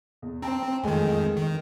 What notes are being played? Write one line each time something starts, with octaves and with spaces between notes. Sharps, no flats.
E2
C4 G5 A5 A#5
F2 D#3 G#3 A3 G#5
D#3